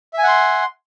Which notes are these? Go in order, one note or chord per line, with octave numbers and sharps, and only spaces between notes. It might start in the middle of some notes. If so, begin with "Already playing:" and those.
E5 F#5 G#5 C6